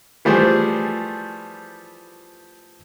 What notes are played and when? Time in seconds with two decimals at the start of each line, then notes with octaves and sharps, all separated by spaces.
0.25 E3 F3 G3 A3 G#4 C5